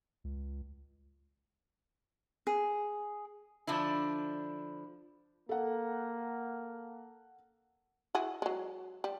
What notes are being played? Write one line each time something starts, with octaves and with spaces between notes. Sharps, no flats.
C#2
G#4
D3 F3 D4 E4
A#3 A4 F#5
E4 F#4 G#4
F#3 G#3
G3